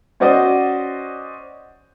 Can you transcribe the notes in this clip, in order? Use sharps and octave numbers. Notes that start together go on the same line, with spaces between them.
C#4 F#4 C5 D5 D#5